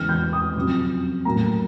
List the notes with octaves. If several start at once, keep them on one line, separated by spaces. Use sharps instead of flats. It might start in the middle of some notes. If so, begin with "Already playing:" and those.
Already playing: E2 C#3 E3 G#3 F6
G6
D#6
F2 C#3 F#3
A2 F#3 A#3 A#5